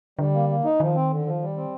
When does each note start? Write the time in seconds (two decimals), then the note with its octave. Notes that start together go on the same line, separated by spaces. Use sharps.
0.19 D3 G3
0.34 A#3
0.49 A#3
0.64 D#4
0.80 D#3 F3
0.95 C4
1.11 D3
1.26 F3
1.42 G3
1.57 C4